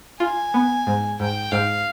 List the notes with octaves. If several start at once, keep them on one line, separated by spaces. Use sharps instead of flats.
F4 G#5
B3
G#2
G#2 G5
G#2 F5